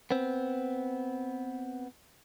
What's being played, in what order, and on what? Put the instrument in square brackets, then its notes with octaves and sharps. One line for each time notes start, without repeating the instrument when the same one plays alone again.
[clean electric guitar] B3 C4